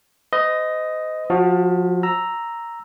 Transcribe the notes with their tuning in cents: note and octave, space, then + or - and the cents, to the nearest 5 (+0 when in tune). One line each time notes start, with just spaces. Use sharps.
C5 -40 D#5 +5
F3 +25 F#4 +0
A#5 +0 E6 +0